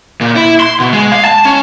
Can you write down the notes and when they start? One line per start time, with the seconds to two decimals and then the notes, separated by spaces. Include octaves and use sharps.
0.21 A#2
0.35 E4
0.60 C6
0.80 B2
0.93 G#3
1.12 F5
1.25 A5
1.45 C#4